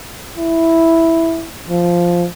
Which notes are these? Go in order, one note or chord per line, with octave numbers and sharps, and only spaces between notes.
E4
F3